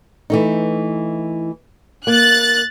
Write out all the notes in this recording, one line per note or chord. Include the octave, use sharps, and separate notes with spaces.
E3 A3 D#4
A#3 F#6 A6